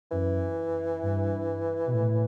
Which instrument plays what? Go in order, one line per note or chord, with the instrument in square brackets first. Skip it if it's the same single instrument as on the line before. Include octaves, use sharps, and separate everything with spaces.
[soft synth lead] F#2 [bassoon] E3
[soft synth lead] G2
B2
A2